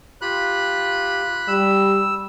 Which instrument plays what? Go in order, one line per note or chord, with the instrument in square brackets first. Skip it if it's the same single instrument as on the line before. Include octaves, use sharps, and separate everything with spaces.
[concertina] F4 G4 [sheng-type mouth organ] B5 F#6
[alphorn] G3 [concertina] E6